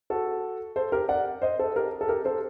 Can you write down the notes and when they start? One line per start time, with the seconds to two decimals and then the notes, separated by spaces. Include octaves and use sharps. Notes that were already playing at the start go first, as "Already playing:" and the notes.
0.10 F#4 A4
0.76 A4 C5
0.92 G4 A#4
1.09 D5 F#5
1.42 C5 D#5
1.59 A4 C5
1.76 G4 A#4
2.01 A4
2.08 G4 A#4
2.25 A4 C5